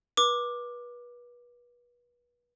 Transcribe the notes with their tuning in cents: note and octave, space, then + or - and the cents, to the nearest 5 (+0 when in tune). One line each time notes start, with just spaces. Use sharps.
B4 -30 D6 +10